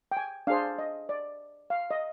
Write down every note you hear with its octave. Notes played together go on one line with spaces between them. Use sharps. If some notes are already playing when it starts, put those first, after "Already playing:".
G5
G#5
D4 G#4 C5 F5
D#5
D5
F5
D#5